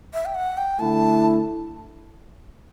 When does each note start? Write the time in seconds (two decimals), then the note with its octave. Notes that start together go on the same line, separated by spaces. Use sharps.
0.14 E5
0.26 G5
0.35 F#5
0.57 G5
0.79 D3 A3 E4 A5